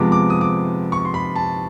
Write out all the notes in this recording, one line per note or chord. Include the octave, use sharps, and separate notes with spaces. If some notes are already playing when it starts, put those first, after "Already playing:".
Already playing: C3 F3 G#3 B3 D6
D6
D#6
D6
C#6
C6
B5
A5